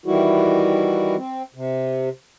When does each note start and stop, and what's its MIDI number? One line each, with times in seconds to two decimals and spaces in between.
0.06 1.16 51
0.06 1.16 52
0.06 1.16 55
0.06 1.16 64
0.06 1.16 66
1.17 1.43 60
1.54 2.09 48